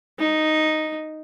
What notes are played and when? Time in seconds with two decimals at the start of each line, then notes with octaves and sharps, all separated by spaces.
0.19 D#4